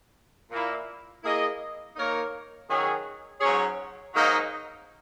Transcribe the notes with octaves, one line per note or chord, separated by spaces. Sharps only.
A#2 A#3 E4
A#3 E4 G#4 D#5
A#3 D#4 A#4 C#5
D#3 F#3 C#4 G#4
G#2 F#3 C#4 G#4 C#5
G#2 F#3 A#3 D#4